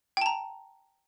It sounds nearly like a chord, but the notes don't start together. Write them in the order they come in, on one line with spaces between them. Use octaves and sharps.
G5 A5 A#5